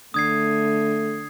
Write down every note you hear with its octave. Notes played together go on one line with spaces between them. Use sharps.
D3 A3 D#6 G#6 C7